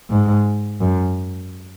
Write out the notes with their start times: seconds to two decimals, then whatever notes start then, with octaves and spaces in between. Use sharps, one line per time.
0.10 G#2
0.81 F#2